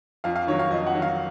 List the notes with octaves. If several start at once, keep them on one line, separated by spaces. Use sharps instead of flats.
F2 F5
F5
D#3 F#3 C#5
F5
F2 D#5
F#5
D#3 F#3
F5